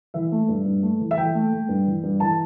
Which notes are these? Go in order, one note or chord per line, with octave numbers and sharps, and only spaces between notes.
E3 E5
A3
G2
G2
A3
E3
E5
E3 G5
A3
A3
G2
E3
G2
E3 A5